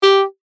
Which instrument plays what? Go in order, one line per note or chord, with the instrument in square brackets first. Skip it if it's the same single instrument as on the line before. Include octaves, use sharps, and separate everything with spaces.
[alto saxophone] G4